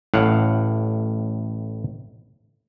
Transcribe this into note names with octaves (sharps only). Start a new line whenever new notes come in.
A1 A2 F5 F#5